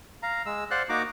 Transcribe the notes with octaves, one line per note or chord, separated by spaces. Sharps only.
F5 A#5
G#3 E6
C5 D5 F5 F#5 C6 F#6
A#3 D#4 F#4 A#5 D6